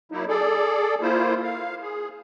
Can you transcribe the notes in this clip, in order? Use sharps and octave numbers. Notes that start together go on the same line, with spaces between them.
F#3 A#3 D#4 E4
G#4 A4 D5
A#3 E4 F4 C5
F5
G#4